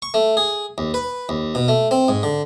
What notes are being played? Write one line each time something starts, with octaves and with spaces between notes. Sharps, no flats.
C#6
A3
G#4
D#2
B4
D#2
B2
A3
C4
G#2
D3